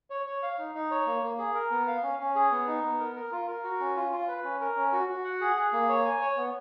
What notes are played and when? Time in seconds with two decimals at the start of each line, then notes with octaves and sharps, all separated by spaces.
0.10 C#5
0.26 C#5
0.43 F5
0.59 D#4
0.75 D#4
0.91 C#5
1.06 A#3
1.23 A#3
1.39 G#4
1.55 A#4
1.71 B3
1.87 F5
2.03 C#4
2.20 C#4
2.35 G#4
2.52 B3
2.67 D#4
2.83 B3
2.99 A#4
3.16 A#4
3.32 F4
3.48 A#4
3.64 F#4
3.80 C#4
3.96 F4
4.12 F4
4.28 B4
4.44 C#4
4.61 A#4
4.77 C#4
4.93 F#4
5.09 F#4
5.24 F#5
5.41 G#4
5.57 G#4
5.73 A#3
5.89 C#5
6.05 G#5
6.21 C#5
6.37 B3